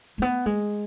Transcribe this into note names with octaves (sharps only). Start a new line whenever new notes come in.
G#3
B3
G#3